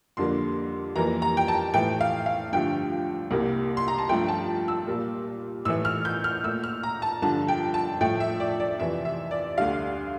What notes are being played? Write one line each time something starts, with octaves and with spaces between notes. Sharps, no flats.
F2 D3 G3 A#3 C6
F2 E3 G3 A#3 A#5
A#5
G5
A5
A2 E3 A3 G5
F5
F5
G2 D3 F3 A3 G5
C2 C3 G3 A#3
C6
A#5
A5
G2 F3 A3 G5
A5
E6
A#2 G3 A#3
A2 E3 A3 E6
F6
G6
F6
A#2 A3 E6
F6
A#5
A5
G2 D3 F3 A5
G5
A5
A2 F3 A3 G5
E5
D5
D5
F2 C3 E3 E5
E5
D5
D2 D3 G3 F5